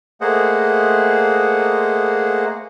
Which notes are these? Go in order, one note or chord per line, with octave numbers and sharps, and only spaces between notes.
A3 A#3 G#4 C5 D#5 F#5